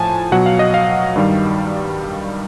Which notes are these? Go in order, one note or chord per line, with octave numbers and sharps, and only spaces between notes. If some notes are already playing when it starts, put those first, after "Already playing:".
Already playing: A2 F3 G#5 A5
B2 F#3 F#5
F5
D#5
F5
G2 D#3 G3